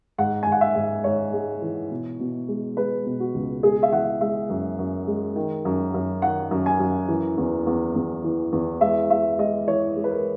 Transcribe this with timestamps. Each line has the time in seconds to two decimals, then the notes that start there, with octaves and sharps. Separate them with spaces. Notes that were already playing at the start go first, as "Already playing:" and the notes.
0.18 G#2 F#5
0.43 G#2 G#5
0.52 F#5
0.61 E5
0.75 G#2
1.04 G#2 C#5
1.33 G#3
1.62 E3
1.91 B2
2.20 B2
2.48 G#3
2.77 G#3 B4
3.06 B2
3.20 F#4
3.34 C#2
3.63 G#3 G#4
3.83 E5
3.92 E3 F#5
4.21 G#3 E5
4.50 F#2
4.79 F#2
5.07 G#3
5.36 D#3
5.65 F#2
5.94 F#2
6.22 D#3 F#5
6.51 F#2
6.66 G#5
6.80 F#2
7.08 E3
7.38 E2
7.67 E2
7.95 E2
8.24 E3
8.52 E2
8.81 G#3 E5
9.10 G#3 E5
9.39 G#3 D#5
9.68 E3 C#5
9.96 G#3
10.04 B4
10.11 A#4